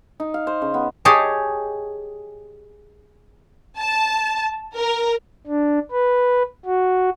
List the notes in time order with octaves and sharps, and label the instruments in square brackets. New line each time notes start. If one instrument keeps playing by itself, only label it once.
[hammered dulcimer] D#4
F5
C5
C#3
B3
[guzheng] G4 G#4 C#5 D#5 G5 A5
[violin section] A5
A#4
[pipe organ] D4
B4
F#4